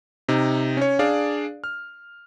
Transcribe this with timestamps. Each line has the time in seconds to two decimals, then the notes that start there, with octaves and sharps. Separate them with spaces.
0.29 C3 D#4
0.77 C#4 C#5
0.99 D4 G#4 D5 F5
1.64 F6